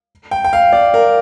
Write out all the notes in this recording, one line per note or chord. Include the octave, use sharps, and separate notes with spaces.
G5
G5
F5
D5
A#4